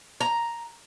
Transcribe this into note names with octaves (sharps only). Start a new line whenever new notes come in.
A#5